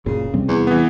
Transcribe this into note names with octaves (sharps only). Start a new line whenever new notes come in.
F#1 A#2 C#3
C3 G3 C4
E2
E3 B3